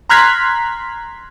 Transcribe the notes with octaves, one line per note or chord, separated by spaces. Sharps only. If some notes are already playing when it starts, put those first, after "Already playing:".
A#5 C6 F6 F#6 G#6 B6